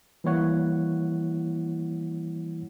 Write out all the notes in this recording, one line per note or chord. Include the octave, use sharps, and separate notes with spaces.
E3 G3 A#3 E4 C#5 F#5